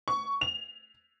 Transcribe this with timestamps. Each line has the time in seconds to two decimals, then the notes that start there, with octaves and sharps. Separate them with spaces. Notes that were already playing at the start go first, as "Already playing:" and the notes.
0.08 C#6
0.41 F7